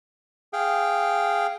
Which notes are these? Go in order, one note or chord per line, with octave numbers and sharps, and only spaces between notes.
G#4 F5 G5